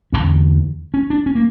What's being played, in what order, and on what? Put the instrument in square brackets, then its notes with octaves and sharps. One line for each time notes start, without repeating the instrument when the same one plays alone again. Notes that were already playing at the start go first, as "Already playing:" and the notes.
[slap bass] E1 C#4
E2 D3
C#4
D4
C#4
A#3